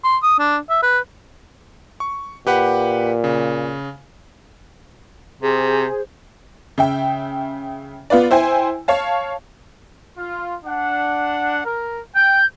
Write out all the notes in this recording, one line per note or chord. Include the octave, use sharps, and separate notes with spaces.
C6
D#6
D4
E5
B4
C#6
A#2 G4 B4 F#5
C#3
C3 G#4 C5
C#3 E5 G5
B3 F4 B4 D5
E4 C5 G5 G#5
C#5 F5 A5
F4
D4 F#5
A#4
G5 G6